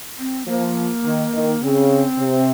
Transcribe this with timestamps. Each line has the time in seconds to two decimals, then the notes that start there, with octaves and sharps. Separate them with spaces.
0.18 C4
0.47 F3 A#3
1.04 D#3
1.33 D#3
1.63 C#3 C4
2.19 C3